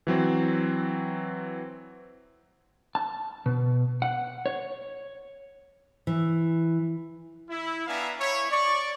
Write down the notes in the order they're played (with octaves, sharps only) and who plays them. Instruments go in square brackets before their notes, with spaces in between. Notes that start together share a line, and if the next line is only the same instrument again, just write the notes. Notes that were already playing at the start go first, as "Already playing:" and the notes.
[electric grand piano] E3 F#3 C4
[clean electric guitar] A5
B2
F#5
C#5
[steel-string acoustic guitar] E3
[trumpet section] E4
B3 D4 E5 F5 G#5 A#5
E4 C#5
D5 C#6